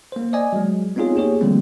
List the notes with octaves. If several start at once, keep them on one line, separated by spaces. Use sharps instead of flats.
A#3 C5
D5 D#5 G#5
F#3 G#3
B3 C4 D#4 F4 G#4 C#5
A#3 G4 G#4 C#5
D3 F3 G3 A3 A#3 C4